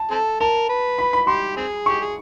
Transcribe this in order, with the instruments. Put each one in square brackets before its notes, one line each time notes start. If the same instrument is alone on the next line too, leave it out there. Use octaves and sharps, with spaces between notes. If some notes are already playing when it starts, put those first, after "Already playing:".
Already playing: [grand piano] A5
[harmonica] C4 A4
[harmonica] A#4 [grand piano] A5
[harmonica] B4
[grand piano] B5
B5
[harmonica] G4 [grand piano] C6
[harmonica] C4 G#4
[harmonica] G4 [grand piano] C#6
[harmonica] G#4